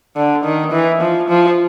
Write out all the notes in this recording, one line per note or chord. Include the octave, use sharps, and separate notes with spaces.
D3
D#3
E3
F3
F3